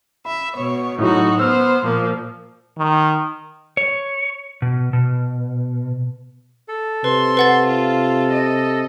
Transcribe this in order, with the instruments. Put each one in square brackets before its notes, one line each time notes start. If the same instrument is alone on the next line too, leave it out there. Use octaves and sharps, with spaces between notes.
[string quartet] E5 [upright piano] B5
[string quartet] B2 B3 C#5
[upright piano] A2 F#3 [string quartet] D#4 F#4
[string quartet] B3 C5 [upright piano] E6 F6
[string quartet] A#2 F3 A#3
[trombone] D#3
[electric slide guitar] C#5
B2
B2
[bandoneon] A4
[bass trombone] C3 [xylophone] B4 [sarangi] C6
[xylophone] B4 F#5 A6
[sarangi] F4
D#5